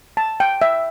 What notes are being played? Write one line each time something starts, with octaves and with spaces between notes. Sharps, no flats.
A5
G5
E5